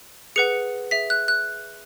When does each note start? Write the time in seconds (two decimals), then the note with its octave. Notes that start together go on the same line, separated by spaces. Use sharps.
0.36 G#4 B4 F#5 C#7
0.91 G#4 E5 B6
1.10 F#6
1.28 F#6